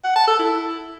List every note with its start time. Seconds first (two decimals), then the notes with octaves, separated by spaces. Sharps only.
0.04 F#5
0.16 A5
0.27 A4
0.39 E4